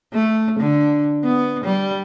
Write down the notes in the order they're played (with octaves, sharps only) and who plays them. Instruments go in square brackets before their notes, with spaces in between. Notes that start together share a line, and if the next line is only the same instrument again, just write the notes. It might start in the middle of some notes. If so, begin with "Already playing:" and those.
[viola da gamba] A3
D3
B3
G3